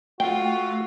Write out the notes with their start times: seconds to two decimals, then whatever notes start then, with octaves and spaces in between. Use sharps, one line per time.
0.20 A3 F4 F#4 G5